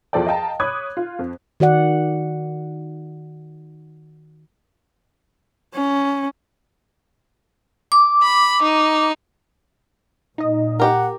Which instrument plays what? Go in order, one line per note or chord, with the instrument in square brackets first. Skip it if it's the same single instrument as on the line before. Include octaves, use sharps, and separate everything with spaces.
[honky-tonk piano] E2 F3 A4 D5 G5
D#5 F5 G5 A5 A#5
C#5 B5 D6 D#6 F#6 G#6
F4
F2
[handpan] D#3 F#4 D5 F#5
[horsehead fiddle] C#4
[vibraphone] D6
[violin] B5
D#4
[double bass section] A#2 [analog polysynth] D#4 D#5
[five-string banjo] G4 A#4 [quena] F#5